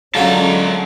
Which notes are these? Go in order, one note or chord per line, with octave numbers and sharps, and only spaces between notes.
D3 F#3 G#3 C#4 F4 F#4 A5 A#5